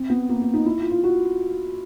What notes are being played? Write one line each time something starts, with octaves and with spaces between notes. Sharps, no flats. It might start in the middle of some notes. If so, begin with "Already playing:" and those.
Already playing: C4
B3
A#3
A#3
D#4
E4
F4
F4
F#4